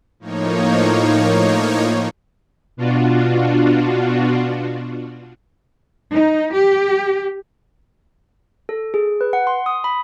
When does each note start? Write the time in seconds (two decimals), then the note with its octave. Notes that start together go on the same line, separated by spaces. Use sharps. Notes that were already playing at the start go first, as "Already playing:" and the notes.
0.19 A2 F3 A#3 D#4 C#5
2.77 B2 D4 F4 F#4
6.13 D#4
6.54 G4
8.69 A4
8.94 G#4
9.21 B4
9.33 F#5
9.47 C6
9.66 D#6
9.84 B5